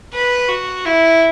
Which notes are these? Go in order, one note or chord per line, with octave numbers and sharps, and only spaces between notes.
B4
F#4
E4